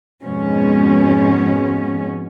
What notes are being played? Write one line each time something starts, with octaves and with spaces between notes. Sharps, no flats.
F2 G#2 B2 F3 G#3 C#4